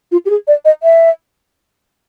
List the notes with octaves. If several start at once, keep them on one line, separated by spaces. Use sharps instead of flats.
F4
G4
G#4
D5
D#5
E5